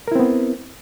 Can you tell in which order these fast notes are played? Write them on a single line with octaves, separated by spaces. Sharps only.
A#4 E4 C4 B3